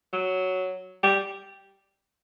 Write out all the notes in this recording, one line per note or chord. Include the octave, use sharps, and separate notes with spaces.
F#3
G3